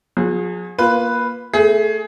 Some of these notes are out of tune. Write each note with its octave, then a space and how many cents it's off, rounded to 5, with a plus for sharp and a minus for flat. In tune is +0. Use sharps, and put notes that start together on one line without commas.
F3 +45 G#4 +0
A#3 +20 F4 +0 B4 +0
A3 +0 G#4 +20